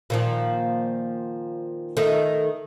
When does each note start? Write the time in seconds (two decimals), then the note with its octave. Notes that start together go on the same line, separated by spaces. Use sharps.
0.10 A#2 D#3 F3
1.97 D#3 A3 D#4